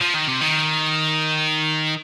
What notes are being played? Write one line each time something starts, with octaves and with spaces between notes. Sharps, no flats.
F3
D#3
C3
D#3